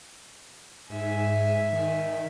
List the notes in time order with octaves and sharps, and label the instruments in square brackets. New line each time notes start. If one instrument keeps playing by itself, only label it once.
[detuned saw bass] G#2 [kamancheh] E5 G#5
[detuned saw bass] D#3